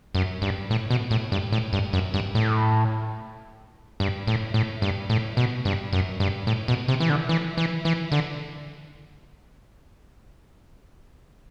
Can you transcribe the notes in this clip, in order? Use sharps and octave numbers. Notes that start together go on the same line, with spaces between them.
F#2
G2
A2
B2
A2
G2
A2
G2
F#2
G2
A2
G2
A2
A2
G2
A2
B2
G2
F#2
G2
A2
B2
C3
E3
D3
E3
E3
E3
D3